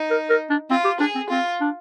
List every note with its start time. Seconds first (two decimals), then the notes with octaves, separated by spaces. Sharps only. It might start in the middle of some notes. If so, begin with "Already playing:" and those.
Already playing: D#4
0.10 A#4
0.30 A#4
0.50 D4
0.70 C4 F4
0.85 G4
1.00 D4 G#4
1.15 C4
1.30 C4 F4
1.61 D4